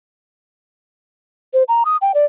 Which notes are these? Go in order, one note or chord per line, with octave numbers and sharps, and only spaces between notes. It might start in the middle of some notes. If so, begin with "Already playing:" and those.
C5
A#5
D#6
G5
D5